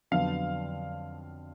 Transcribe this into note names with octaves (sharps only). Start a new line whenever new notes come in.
F2 D3 F#3 B3 F5